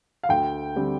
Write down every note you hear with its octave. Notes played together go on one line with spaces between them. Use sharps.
F5
D2 G5
D3 G3 C4